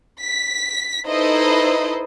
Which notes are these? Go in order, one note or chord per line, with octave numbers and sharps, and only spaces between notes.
B6
D#4 E4 A4 B4 C5 D#5